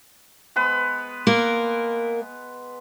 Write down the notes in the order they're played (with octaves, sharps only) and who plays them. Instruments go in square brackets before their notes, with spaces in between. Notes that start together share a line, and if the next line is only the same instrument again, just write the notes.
[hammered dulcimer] G#3 B3 B4
[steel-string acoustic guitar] A#3 A#4